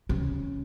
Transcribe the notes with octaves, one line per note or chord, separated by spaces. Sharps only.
C#3